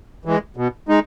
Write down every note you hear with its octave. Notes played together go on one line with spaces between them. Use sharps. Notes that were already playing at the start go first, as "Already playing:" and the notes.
E3 G#3
B2
G#3 D#4